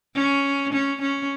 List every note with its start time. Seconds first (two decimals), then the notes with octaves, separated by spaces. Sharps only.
0.15 C#4
0.73 C#4
1.01 C#4